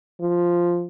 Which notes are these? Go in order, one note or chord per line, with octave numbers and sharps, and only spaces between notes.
F3